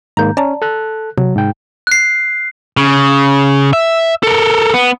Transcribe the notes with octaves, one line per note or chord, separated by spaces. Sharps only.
G#2 D#3 A#3 A#5 G6
C#4 D5 A5 A#5
A4 F#6
C3 F#3
G#2 G5
F#6 C7
C#3
E5
A4 A#4
B3